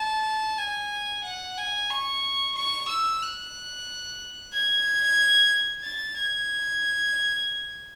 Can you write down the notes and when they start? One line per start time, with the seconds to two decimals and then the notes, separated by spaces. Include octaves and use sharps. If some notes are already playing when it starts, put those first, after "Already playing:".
Already playing: A5
0.58 G#5
1.25 F#5
1.58 G#5
1.91 C#6
2.56 C#6
2.89 E6
3.22 F#6
4.53 G#6
5.84 A6
6.17 G#6